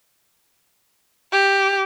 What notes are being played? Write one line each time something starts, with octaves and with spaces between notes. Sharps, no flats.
G4